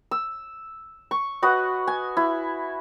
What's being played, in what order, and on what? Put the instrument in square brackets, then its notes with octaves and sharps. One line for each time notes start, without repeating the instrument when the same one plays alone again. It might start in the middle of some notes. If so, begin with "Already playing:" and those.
[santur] E6
C#6
F#4 B4 D#5 F#5
G#5
E4